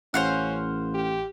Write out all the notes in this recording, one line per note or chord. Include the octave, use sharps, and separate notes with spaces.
A1 C#4 C5 F5 F#5
G4